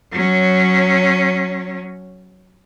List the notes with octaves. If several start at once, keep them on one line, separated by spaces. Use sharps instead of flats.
F#3 C#4